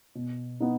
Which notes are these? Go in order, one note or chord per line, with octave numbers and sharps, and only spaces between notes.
B2
B3 D#4